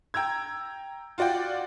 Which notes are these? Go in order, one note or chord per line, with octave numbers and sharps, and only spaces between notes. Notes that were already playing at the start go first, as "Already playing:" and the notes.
G5 A#5 E6 G#6
F4 F#4 D5 F#5 G5